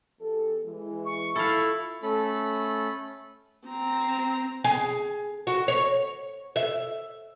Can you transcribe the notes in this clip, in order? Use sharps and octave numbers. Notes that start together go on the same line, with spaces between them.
E2 G4 A4
E3 G#3
C#6
E4 F4 A4 F5
A3 C#4 A4 B5
C4 A#5
G#4
F#4
C#5
E5